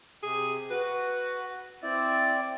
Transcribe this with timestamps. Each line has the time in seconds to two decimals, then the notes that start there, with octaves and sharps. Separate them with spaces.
0.23 C3 G#4
0.70 F#4 B4
1.83 C4 E4 D5